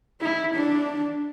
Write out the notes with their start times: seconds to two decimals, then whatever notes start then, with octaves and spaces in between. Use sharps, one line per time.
0.21 E4
0.55 D4